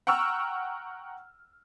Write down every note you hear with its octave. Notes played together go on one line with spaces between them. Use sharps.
F#5 G5 A#5 C#6 E6 F6